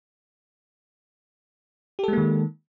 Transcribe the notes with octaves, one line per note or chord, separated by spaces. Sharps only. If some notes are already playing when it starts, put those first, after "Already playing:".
D#3 G#3 A#3 G4 A4